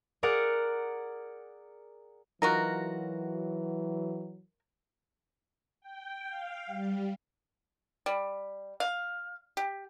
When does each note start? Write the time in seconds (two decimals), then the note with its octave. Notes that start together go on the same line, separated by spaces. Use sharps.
0.23 G#4 A#4 D5 F#5
2.42 E3 F#3 D#4 F4 F#4 A#4
5.81 G5
6.27 F5
6.66 G3
8.06 G3
8.80 F5
9.57 G4